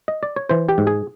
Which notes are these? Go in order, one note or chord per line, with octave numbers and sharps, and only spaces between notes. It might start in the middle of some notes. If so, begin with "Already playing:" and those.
D#5
D5
C#5
E3 C5
G4
G#2
G#4